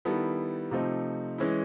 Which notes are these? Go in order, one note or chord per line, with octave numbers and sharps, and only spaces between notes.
D#3 G3 B3 E4 A4
C3 F3 A3 C4 D#4
E3 G#3 C#4 E4